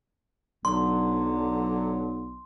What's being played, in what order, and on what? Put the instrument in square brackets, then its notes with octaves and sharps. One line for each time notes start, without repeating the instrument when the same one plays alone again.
[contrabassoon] B1 [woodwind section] D3 F#3 [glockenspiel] C6